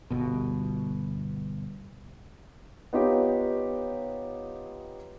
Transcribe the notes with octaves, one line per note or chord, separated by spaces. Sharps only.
G1 B2
B3 D#4 F4 G4 C#5